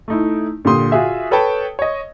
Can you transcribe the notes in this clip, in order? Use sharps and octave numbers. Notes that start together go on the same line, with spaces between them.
A3 D#4 E4
A#2 D3 G4 C6 D#6
F4 F#4 G#4 E5
A4 B4 C#5 G5 A5
C#5 D#5